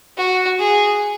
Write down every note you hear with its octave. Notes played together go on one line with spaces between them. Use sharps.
F#4
G#4